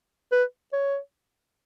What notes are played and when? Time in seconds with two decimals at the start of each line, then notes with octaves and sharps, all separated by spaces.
0.32 B4
0.73 C#5